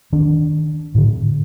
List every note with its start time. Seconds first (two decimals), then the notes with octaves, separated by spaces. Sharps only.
0.13 D#3 D4
0.95 A2 D3